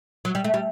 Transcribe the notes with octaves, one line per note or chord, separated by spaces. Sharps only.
F#3
G3
A3
G3